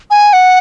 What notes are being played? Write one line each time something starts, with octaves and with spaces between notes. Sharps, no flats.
G#5
F#5